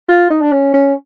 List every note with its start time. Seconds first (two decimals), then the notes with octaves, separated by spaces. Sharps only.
0.09 F4
0.30 D#4
0.42 D4
0.52 C#4
0.74 C#4